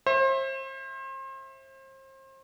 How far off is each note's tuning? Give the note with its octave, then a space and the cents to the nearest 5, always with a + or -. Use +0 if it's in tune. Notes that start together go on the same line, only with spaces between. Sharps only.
C5 +35 E5 +0